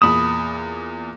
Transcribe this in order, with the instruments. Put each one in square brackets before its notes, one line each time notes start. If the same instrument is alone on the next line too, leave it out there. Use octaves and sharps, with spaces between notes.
[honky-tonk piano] E2 A#2 E7 [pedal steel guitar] B5 D#6